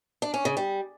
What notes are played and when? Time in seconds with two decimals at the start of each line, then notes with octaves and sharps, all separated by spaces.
0.22 D4
0.34 C#4
0.45 C#3
0.57 G3